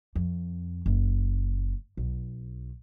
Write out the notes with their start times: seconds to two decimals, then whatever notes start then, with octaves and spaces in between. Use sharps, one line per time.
0.15 F2
0.86 F#1
1.97 B1